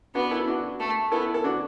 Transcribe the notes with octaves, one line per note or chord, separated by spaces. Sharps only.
B3 D4 F#4
E4 A4
D4 F#4
A3
B3 E4 A4
A4
D4 F#4